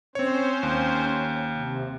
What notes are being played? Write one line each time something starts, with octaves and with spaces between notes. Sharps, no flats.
C4 C#4 C5 C#5
D#2
C3